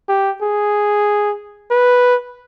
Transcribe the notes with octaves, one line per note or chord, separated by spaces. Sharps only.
G4
G#4
B4